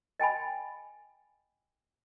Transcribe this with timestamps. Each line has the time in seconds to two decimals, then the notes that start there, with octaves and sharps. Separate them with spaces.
0.20 D#5 G5 G#5 B5